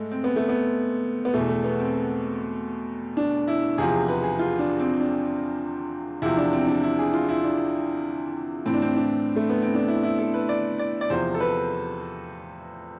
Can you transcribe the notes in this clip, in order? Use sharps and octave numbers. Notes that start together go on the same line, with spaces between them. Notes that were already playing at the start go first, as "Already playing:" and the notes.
Already playing: G#2 G#3 A3
C4
B3
A3
B3
B3
E2 B2 A3
A3
B3
C4
D4
E4
E2 C3 F3 G#4
B4
G#4
F4
D4
C4
D4
E2 C3 F3 E4
D4
C4
D4
E4
G#4
F4
E4
D4
A2 E3 C4
D4
C4
D4
A3
B3
C4
D4
E4
E4
A4
B4
D5
D5
D5
E2 C3 F3 C5
A4
B4